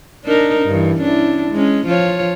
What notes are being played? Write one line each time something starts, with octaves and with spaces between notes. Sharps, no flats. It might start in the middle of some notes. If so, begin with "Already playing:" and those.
D4 D#4 A#4
G2 E3
C#4 D4 E4
G#3 C#4
F3 F4 C#5